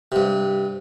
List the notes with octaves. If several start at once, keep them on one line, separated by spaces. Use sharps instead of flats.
G2 C3